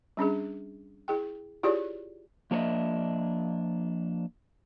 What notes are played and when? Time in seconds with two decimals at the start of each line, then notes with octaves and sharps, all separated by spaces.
0.17 G3 C#4 D4 G#4
1.08 E4 G#4 G5
1.63 E4 F4 G4 G#4 C#5 D5
2.51 F3 A#3 D4 C#5 D#5 E5